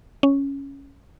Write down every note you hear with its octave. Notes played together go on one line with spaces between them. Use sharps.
C#4